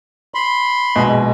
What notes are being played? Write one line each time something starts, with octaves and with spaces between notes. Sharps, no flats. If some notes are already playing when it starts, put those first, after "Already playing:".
B5 C6
A#1 B2 G#3